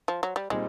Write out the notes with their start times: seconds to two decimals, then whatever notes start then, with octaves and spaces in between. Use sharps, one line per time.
0.08 F3
0.23 F#3
0.36 G3
0.50 A#2 G3 G#3 C4 D#4